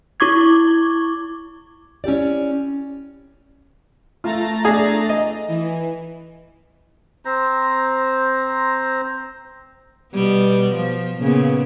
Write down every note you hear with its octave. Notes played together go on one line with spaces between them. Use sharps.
E4 C#6 D6 G#6
C#4 E4 G4 D5
A3 F4 A#5 A6
D4 G#4
D#5
E3
C4 C5 A#5
B2 G3 B3
F3
A#2 C#3 B3